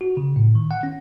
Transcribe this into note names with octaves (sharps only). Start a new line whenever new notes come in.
F#4
C#3
A2
D#3
F#5
C#4